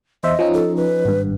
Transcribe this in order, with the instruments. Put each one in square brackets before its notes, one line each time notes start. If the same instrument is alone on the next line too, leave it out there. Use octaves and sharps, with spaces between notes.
[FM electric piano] E2 C5 E5 [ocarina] D#5
[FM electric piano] F3 C#4 D#4
[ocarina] A4
B4
[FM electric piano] G#1 G2